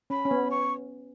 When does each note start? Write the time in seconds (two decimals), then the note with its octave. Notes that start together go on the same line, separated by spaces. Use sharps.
0.10 C#4 B5
0.25 C#4
0.31 B3
0.51 C#6